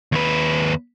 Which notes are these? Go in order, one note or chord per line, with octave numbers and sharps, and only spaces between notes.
D#2 B4